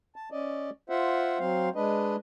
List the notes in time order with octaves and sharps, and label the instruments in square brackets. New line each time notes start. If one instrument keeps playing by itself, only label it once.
[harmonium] A5
C#4 D5 D#5
F4 C5 E5 F#5
F#3 C4 C5 F5
G#3 D4 B4 D#5